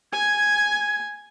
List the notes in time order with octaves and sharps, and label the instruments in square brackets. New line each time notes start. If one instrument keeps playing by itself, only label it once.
[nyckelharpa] G#5 [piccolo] G#6